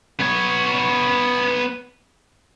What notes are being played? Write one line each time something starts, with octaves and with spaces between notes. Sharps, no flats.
B3 C#5